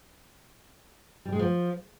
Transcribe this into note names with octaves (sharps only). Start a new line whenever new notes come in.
G3
G#3
F3